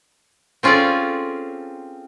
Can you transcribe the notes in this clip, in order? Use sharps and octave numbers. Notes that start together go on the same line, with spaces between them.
C4 C#4 F4 G#4 A4 D5